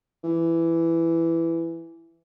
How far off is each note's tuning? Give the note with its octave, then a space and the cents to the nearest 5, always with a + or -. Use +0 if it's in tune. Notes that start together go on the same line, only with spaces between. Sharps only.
E3 +10